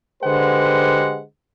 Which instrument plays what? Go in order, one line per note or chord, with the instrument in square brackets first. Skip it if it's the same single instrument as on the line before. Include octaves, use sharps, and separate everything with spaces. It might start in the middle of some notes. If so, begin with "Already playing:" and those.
[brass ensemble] D3 G#3 G4 B4 C5 F#5